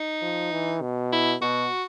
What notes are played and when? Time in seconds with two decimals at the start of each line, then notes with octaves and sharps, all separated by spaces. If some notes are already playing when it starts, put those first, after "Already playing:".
Already playing: D#4
0.22 F3
0.52 E3
0.82 B2
1.13 E4
1.41 B2 F#4